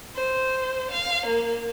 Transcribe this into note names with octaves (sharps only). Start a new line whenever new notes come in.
C5
F5
A#3